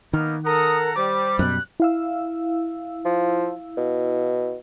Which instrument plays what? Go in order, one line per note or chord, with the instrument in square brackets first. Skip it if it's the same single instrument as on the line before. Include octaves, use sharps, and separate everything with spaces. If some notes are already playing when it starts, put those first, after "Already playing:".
[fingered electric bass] D#3 [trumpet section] A#3 B3 D#4 [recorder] F6
[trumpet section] A4 F#5 A#5 [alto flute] A#4 [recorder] D#6
[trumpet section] G3 [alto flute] C5 [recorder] D6
[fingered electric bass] F#2 B2 [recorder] F#6
[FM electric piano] E4 F5 E6
[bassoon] F3
B2